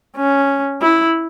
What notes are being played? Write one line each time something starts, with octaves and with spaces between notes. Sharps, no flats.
C#4
E4